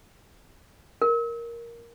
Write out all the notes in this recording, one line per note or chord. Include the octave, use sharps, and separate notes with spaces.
A#4